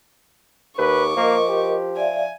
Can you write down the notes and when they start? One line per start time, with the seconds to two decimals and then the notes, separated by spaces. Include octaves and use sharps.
0.79 D#2 B4 C#6 D6
1.17 F3 A#3 A#4 D#5
1.49 G4
1.96 D5 E5 F5 G#5